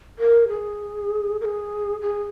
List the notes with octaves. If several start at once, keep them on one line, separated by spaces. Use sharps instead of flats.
A#4
G#4
A#4
G#4
G#4